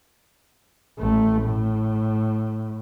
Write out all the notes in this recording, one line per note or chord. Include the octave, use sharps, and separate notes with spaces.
A1 A3
A2